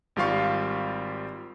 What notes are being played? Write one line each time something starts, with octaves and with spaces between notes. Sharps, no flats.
G#1 G3 F4 F5 C#6